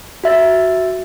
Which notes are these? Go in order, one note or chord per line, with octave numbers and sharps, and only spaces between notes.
F#4 E5 A6